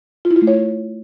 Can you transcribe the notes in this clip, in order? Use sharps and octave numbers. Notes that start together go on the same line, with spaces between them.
F4
E4
F4
A3
C#5